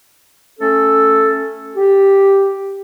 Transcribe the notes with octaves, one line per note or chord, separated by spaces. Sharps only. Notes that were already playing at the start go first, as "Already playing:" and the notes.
A3 C#4 A4
G4